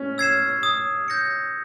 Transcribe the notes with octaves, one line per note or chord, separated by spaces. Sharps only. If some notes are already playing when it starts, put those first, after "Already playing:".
Already playing: C#4
E6 G#6 C7 E7
D#6
G6 A#6 C#7